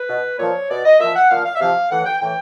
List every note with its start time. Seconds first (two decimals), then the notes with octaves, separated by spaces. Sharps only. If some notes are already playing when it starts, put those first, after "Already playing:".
Already playing: B4
0.09 B2
0.39 A#2 F3 C#5
0.70 B2 D5
0.85 D#5
1.00 A#2 F3 E5
1.16 F#5
1.30 A#2 F3 F5
1.45 F5
1.55 E5
1.60 C3 F3 F5
1.91 A2 E3 F#5
2.05 G5
2.21 A2 E3 G5